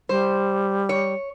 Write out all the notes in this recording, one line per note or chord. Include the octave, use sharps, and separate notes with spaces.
G3 C5
C#5